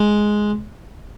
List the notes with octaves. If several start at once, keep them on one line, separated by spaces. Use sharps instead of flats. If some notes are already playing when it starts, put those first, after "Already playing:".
Already playing: G#3